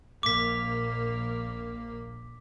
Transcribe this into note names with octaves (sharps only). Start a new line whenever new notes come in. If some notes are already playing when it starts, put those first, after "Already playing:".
A#1 A#3 D6 B6